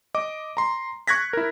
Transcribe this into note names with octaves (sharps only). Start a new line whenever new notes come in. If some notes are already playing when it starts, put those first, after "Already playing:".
D#5 D6
A#5 C6
C#6 F#6 G#6 A#6 B6
E4 A#4